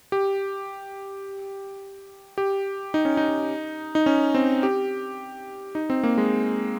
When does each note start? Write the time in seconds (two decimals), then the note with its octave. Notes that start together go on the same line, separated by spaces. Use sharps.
0.12 G4
2.38 G4
2.94 D#4
3.05 C#4
3.17 D#4
3.95 D#4
4.06 C#4
4.35 C4
4.63 G4
5.75 D#4
5.90 C4
6.03 A#3
6.18 G#3